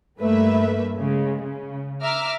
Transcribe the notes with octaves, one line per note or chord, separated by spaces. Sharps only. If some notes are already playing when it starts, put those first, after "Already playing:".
G2 A3 A#3 B4 E5
C#3 G#3
C#3
E5 A#5 D6 E6 F6